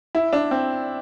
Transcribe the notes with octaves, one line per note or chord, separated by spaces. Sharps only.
E4
D4
C4